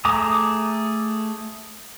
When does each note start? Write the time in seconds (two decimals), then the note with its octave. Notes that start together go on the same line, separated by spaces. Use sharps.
0.05 A3 G#4 A#5 D6 D#6